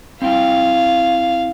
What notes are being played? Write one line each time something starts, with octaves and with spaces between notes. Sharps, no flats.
C4 E4 F5 G5